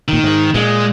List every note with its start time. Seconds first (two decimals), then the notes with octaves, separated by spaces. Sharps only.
0.08 A#2 D#3
0.24 G#2
0.54 A#2 G#3